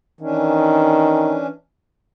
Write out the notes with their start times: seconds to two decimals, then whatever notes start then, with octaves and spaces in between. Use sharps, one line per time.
0.21 D#3 E3 C#4 D4